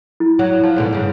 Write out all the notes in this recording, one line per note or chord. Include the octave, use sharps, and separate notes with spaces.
E4
F#3
F3 A5
G#2 B2 D3
G2 C#3